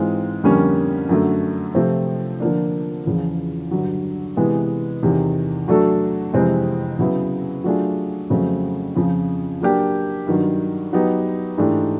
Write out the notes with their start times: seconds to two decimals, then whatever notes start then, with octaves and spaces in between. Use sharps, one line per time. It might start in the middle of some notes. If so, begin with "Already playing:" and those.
Already playing: G#2 E3 G#3 C4 F4
0.44 F2 D3 G3 A#3 C#4
1.09 F#2 D3 F#3 A3
1.75 C3 F3 A3 C4
2.40 D3 F3 A#3 D4
3.06 E2 C#3 F3
3.71 G2 D3 F#3
4.37 C3 E3 G#3 B3
5.03 E2 C3 D#3
5.68 F#3 A3 D4 F#4 A4
6.33 F2 C3 E3 G#3 C4
6.99 C#3 F#3 B3 E4
7.64 F#3 A3 D4 F4 G#4
8.30 F2 C#3 F#3 A3 C4
8.96 F2 C#3 F3
9.61 F#3 A#3 D4 G4
10.27 G2 D#3 F#3
10.93 F#3 B3 D#4 G4
11.58 G#2 E3 A3 D4 G4